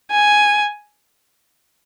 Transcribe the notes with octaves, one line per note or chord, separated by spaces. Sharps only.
G#5